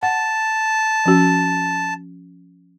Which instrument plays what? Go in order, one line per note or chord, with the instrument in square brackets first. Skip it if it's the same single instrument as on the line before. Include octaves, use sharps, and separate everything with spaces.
[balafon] F#5 [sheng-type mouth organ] A5
[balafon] F3 C#4 F#4